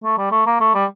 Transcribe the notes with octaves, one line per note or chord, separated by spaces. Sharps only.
A3
G3
A3
A#3
A3
G3